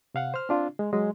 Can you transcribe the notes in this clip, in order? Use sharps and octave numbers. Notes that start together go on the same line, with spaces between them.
C3 F5 F#5
C5 F6
C4 D4 F4
G#3
F#3 G#3